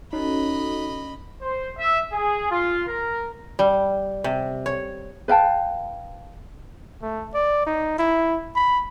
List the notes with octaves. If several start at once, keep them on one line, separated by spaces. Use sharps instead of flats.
C#4 D#4 F#4 A4 D#5 B5
C5
E5
G#4
F4
A#4
G3
C3
C#5
B4 F5 G5 A5
A3
D5
D#4
E4
B5